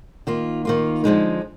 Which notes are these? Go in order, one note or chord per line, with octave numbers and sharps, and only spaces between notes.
D#3 A#3 F4
D#3 A#3 F4
D3 F3 G#3 D#4